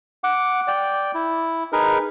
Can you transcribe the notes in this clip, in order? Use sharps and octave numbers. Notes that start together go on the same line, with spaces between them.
F#5 D6
D5 G5
E4
D#4 G#4 A#4 B4